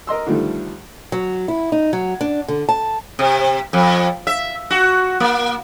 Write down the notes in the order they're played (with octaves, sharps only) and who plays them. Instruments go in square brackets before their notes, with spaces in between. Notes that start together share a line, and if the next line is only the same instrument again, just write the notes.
[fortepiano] A#4 D#5 C6 E6
D3 D#3 F3 G3 A3
[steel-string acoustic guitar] F#3
E4
D#4
F#3
D4
D3
A5
[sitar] C3
F2
E5
F#4
A#3